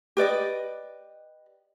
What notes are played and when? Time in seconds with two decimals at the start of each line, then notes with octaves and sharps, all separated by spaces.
0.17 G4 B4 D5 D#5